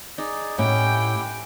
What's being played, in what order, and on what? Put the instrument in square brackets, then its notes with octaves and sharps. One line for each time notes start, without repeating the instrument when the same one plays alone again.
[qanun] D#4 [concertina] G#4 D5
[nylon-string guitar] A2 [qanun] C#4 [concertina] E4 G4 F#5 [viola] G5